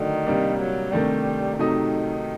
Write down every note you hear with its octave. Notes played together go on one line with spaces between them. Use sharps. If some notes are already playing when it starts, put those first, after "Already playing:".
Already playing: D3 D#3 F#3 A3 D4
C3 G3 A#3 D4
F#3
C3 D#3 G3 A3 D4
C3 D#3 F#3 A3 D#4